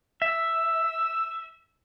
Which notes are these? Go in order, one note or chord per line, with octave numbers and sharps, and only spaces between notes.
E5 E6